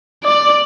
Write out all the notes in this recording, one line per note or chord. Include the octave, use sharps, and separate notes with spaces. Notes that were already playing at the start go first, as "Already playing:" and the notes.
D5